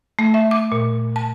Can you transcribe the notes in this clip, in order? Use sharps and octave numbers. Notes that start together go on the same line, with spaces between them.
A3
E5
D6
A#2
A5